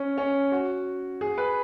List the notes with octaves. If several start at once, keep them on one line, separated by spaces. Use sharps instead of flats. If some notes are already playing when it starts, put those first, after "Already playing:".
Already playing: C#4
C#4
F#4
G#4
B4